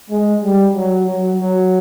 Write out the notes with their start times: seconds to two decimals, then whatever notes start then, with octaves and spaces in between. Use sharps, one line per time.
0.10 G#3
0.42 G3
0.74 F#3
1.05 F#3
1.37 F#3